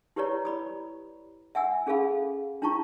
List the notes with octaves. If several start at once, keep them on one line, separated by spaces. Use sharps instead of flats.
E4 G4 B4 C#5 D5 A#5
D5 B5 D#6
E5 F#5 G#5 E6
C#4 G#4 A4 F5 B5
D4 E4 F4 A5 A#5 C#6